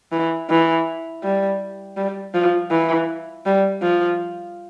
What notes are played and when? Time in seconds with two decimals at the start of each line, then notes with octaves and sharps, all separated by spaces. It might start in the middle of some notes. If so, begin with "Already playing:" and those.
0.12 E3
0.50 E3
1.23 G3
1.97 G3
2.34 F3
2.71 E3
3.46 G3
3.82 F3